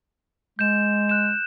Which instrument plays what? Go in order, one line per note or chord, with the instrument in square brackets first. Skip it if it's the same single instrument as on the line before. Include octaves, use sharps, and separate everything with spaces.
[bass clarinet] G#3 [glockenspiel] G6 E7
[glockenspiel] F#6 E7